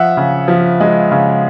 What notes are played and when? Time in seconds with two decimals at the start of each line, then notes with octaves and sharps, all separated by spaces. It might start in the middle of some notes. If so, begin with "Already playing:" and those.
Already playing: F3 E5 F#5
0.17 C#3
0.48 F3
0.80 G#3
1.11 C#3